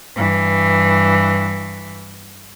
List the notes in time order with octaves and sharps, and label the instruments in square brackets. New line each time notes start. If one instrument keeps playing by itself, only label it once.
[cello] G2 E3